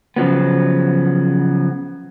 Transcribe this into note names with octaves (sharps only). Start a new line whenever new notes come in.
C#3 F3 F#3 B3